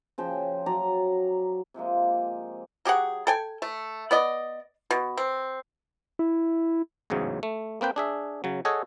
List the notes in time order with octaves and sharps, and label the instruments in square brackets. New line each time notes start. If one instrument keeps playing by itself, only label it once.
[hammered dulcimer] C#3 F3 G5
F#3 D5 A#5
C3 F3 G#3 A#3
[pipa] F#3 G4 G#4 F#5
A4 G5 G#5
A3
B3 D5 D#5
B2
C4
[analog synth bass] E4
[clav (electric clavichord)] A1 E2 G#2 C#3 F#3
A3
A#3 C4 B4 G5
D4 G#4 E5
C#3 F#3
G#4 A4 C#5 D#5 F#5 G#5